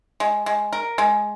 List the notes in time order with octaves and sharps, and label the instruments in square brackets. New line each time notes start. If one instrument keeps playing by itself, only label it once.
[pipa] G#3
G#3
A#4
G#3